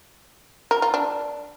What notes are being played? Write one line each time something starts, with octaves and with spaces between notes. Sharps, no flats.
A#4
F4
D4